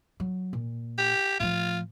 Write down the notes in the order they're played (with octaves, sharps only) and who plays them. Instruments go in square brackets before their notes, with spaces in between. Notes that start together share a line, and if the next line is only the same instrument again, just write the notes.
[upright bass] F#3
A#2
[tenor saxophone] G4
[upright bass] A2 F3 [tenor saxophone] F4